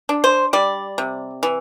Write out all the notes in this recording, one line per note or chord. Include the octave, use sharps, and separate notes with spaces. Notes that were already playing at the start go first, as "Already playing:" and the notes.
D4
C5
G3 D5
C3
E3